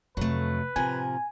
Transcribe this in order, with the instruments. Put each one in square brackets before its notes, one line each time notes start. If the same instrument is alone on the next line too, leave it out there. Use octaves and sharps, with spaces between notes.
[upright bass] F2 C3 [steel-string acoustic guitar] F#3 A3 [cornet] B4
[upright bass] A2 [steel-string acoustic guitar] C3 F3 A#4 [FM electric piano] G#5